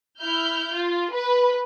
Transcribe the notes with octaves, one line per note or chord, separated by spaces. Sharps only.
E4 F6 G6
F4
B4